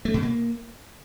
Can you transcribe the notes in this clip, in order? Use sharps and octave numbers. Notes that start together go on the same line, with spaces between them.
A3
B2
A#3